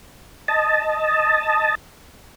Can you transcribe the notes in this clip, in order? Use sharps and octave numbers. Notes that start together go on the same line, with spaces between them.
D#5 A5